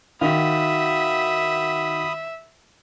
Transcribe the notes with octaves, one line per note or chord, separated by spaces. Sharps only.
D#3 F#4 E5 F5 B5 D#6